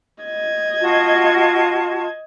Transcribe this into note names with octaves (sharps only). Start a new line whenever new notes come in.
D#5 G#6
F4 F#4 A5